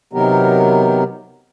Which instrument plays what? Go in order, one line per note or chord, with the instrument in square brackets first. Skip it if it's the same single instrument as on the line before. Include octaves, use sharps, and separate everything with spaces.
[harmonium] C3 D#3 F#3 B3 G4 A#4